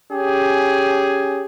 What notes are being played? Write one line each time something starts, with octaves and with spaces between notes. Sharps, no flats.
C#4 G4 G#4